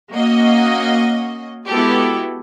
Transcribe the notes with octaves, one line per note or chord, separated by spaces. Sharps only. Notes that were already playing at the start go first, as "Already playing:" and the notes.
A#3 C#4 F#4 D#5
G#3 B3 E4 F#4 G4 A4